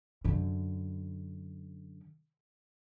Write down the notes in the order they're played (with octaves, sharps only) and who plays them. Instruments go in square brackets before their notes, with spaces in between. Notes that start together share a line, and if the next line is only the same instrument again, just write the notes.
[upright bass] F#2 D3